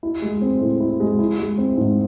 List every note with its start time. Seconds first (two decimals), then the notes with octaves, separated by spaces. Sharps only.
0.03 E4
0.22 G#3
0.42 C4
0.61 A2
0.80 E4
1.00 G#3
1.19 E4
1.39 G#3
1.58 C4
1.77 G#2